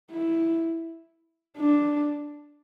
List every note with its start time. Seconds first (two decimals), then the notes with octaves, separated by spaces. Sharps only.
0.11 E4
1.57 D4